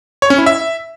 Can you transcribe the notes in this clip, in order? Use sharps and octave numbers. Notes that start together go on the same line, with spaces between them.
C#5
C#4
E4
E5